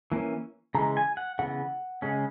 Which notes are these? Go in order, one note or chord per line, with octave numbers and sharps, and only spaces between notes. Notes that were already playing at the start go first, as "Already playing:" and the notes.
E3 A#3 C#4
C#3 E3 G#3 A#5
G#5
F#5
C#3 E3 B3 F#5
C#3 G#3 C#4